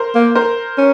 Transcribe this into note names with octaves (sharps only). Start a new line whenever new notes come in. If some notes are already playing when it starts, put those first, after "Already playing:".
Already playing: A#4 C5
A#3
A#4 C5
C#4